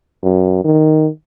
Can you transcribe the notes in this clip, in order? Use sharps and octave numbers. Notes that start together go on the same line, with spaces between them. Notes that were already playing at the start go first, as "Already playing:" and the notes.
F#2
D#3